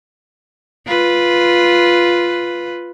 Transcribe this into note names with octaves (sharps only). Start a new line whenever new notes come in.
F4 B4